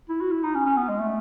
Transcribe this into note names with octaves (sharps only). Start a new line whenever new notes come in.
E4
F#4
E4
D#4
C#4
C#4
B3
G#3
A3